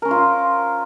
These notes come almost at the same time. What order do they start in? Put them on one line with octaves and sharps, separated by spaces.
A#4 C#4 C5 F4